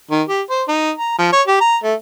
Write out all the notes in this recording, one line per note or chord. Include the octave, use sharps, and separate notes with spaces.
D#3
G4
C5
D#4
A#5
F3
C#5
G4
A#5
A3